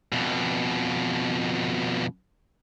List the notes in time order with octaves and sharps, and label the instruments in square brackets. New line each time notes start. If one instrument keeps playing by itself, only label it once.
[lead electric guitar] F2 B2